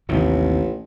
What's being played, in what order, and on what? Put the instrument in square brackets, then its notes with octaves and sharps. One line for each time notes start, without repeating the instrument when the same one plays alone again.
[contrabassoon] A1 [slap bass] D#2 C3 D#3